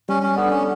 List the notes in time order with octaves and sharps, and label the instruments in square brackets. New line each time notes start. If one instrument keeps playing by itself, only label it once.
[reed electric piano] G3 [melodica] C#4
[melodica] C#4
[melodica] B3 [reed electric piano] D4 A4 D5
[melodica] C#4